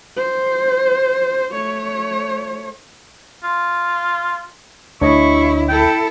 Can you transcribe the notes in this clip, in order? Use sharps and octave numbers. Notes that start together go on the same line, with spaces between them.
C5
A3 C#5
F4
D2 D4 E4 C#5 D#5 C#6
E4 A4 G5